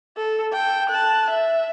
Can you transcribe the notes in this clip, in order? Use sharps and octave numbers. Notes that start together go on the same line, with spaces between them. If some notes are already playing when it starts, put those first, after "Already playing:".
A4
A4 G5
A5 F#6
E5